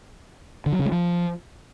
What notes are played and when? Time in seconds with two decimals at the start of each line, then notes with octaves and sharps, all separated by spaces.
0.66 D3
0.73 F#3
0.79 C#3
0.86 G#3
0.92 F3